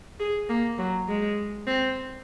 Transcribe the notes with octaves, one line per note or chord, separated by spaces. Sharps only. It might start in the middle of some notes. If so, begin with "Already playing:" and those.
G#4
A#3
F#3
G#3
C4